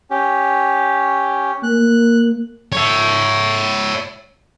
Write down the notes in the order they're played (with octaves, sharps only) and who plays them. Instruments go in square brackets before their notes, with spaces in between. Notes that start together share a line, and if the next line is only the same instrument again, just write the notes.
[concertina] C#4 G4
[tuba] A#3 [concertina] F#6
[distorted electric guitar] C#5 E5